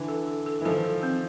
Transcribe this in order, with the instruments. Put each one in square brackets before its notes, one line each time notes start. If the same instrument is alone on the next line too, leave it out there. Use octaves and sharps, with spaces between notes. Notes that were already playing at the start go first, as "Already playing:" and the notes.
Already playing: [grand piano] D3 E3
[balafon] A4
A4
A4
[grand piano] E3
[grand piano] D#3 F3 [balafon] A4
[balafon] A4
C4